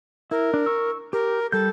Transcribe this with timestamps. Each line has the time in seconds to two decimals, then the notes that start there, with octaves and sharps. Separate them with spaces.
0.31 E4 A#4
0.54 D4
0.66 C#6 E6
1.13 G4 A#4
1.52 G3 A4 G6